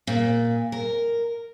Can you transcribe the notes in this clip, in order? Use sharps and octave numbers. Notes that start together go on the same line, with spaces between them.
A#2
A#4